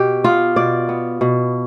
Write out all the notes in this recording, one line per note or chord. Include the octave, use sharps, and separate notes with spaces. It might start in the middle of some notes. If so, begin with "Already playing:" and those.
Already playing: B2 G4
B3 F4
B2 D5
B3
B2